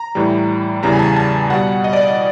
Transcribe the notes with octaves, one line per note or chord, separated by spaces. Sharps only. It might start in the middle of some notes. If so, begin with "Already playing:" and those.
Already playing: A#5
A2 E3 G3
E2 C#3 E3 G3 A#5
G#5
A5
A5
B2 G3 F#5
D#5
D5
D#5